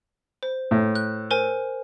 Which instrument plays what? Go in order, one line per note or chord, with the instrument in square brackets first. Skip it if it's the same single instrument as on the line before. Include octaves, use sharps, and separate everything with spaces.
[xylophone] C5
[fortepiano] A2
[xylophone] F#6
A#4 C5 G#5